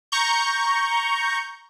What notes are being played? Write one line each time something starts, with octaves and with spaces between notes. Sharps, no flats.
A#5 C#6 G6